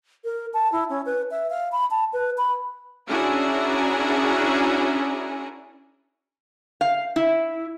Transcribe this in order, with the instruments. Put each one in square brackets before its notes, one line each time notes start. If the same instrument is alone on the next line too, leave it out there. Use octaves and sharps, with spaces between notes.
[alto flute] A#4
A5
E4
C#4
B4
E5
F5
B5
A5
B4
B5
[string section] C#4 D4 E4 F#4 G#4 A#4
[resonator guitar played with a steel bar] F5
E4